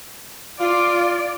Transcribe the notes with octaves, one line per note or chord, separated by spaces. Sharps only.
F4 D5